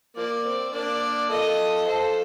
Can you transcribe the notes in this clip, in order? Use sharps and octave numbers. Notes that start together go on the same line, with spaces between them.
F3 A#3 D5
C4
A#3 D4 D5
F4 A4 D#5
F4 A4 C5